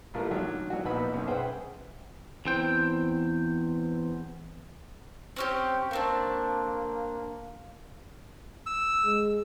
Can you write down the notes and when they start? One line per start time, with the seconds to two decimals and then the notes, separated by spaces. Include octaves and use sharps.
0.14 A1 A3 A#3 E4 F4 A#4
0.31 D3 D#3 F#3
0.70 F#3 F#4
0.85 A#1 D#2 B3 D#4 B5 E6
1.13 B1 F#2
1.27 G#4 B4 C5 E5 F#5 G5
2.45 E2 C4 G5
5.36 C4 C#4 G4
5.91 A3 A#3 C4 D4
8.66 E6
9.05 G#3